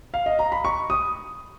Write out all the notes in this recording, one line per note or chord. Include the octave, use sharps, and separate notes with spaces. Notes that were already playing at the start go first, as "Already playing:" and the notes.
F5
D#5
A#5
B5
C#6
D#6